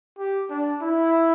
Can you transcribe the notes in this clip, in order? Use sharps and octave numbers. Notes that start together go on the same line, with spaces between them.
G4
D4
E4